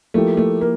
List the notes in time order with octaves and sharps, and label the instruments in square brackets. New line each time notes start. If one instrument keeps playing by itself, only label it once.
[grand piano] F3 A#3 E4 G4 [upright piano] A3
[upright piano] A3
A#3